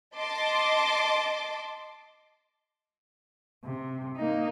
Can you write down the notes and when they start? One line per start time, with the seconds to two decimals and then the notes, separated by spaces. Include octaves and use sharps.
0.16 D#5 A5 C6 D6
3.65 C3
4.17 A#3 D#4